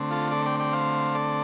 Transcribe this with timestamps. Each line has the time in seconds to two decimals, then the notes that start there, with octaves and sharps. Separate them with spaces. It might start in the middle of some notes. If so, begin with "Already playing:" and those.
Already playing: D3 A3 C4
0.11 F4 A4
0.31 A4 D5
0.46 D5 G5
0.60 D5 G5
0.73 C5 F5
1.15 A4 D5